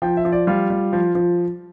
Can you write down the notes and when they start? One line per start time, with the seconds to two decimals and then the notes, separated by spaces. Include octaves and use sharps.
0.02 F3 G5
0.17 E5
0.25 F3
0.32 D5
0.47 G3 F4
0.70 G3
0.93 F3
1.15 F3